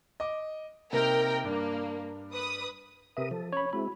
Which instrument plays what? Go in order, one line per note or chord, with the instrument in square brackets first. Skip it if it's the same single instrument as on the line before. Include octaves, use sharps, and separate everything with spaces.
[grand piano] D#5 D6
[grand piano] C3 A#3 D#4 [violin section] A#4 G5
[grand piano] G2 D4 [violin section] A#3
[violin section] B4 D#6
[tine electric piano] C3 E5 [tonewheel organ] A#4 B4 D#6
[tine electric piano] F3 [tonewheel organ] A4
[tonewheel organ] C#4 [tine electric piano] C#5 B5
[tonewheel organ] G#3 C4 E4 [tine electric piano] F#4 B5